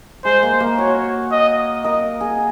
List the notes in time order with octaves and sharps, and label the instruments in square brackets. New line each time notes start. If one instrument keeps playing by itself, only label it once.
[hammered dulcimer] G#3 [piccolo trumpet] C5
[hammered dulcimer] A#3
A#3
[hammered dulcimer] F#4 [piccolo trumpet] C#5
[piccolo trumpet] D#5
[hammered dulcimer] A#4 [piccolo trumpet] D#5
[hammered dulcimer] G#4